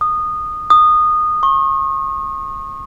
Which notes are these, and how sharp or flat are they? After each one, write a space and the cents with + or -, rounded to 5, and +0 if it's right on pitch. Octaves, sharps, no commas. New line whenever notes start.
D#6 -20
D#6 -20
C#6 -35